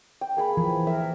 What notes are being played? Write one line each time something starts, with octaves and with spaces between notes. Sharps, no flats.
G5
A#3 G#4 B5
E3 F3 G#4
A#4 E5